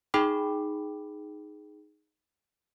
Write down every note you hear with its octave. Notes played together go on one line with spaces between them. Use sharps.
D#4 G#4 G5 B5 D6